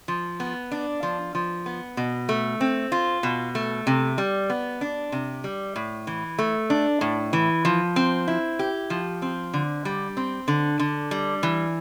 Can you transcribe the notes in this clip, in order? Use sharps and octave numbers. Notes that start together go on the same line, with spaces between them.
F3
B3
D4
F3
F3
B3
B2
A3
C4
F4
B2
A3
C3
G3
B3
D4
C3
G3
A2
E3
A3
D4
A2
E3
F3
C4
E4
G4
F3
C4
D3
G3
C4
D3
D3
G3
E3